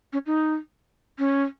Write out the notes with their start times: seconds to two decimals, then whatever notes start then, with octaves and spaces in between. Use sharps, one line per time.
0.13 C#4
0.26 D#4
1.19 C#4